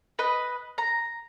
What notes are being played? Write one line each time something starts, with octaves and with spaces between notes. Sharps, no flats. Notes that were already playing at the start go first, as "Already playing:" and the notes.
B4 D#5
A#5